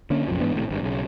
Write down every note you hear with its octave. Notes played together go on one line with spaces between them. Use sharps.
D3 A#3 C#4
F1 A#1 F#2 F3
G#2 E3 B3 D4
G#1 A2 C3
G#1 G2
B1 C#3